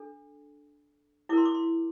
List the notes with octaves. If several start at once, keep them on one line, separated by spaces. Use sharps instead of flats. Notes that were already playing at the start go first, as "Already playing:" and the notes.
Already playing: D4 A4
E4 A#4 C6 D6
D6
C6